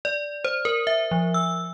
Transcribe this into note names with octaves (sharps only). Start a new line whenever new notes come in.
D5
C5
A#4
E5
F3
E6